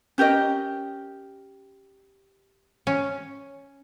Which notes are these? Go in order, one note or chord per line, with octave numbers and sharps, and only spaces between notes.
C#4 G4 A#4 D#5
C#4